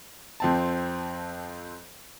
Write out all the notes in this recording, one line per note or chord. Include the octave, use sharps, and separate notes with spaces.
F2 C4 A5